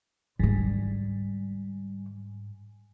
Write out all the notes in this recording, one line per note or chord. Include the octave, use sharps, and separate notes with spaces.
G#2 D3 G3